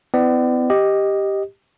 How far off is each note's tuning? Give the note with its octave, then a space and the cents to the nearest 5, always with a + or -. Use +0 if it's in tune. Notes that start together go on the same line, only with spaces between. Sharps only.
B3 +40 E4 +0 D5 +30
G4 +0 D#5 +0